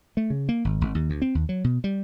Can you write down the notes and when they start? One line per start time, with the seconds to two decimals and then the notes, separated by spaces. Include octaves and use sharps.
0.17 A3
0.30 C#3
0.49 A#3
0.65 G#1
0.81 G#1
0.95 D#2
1.10 D2
1.22 C4
1.35 D#2
1.49 F#3
1.64 B2
1.84 G3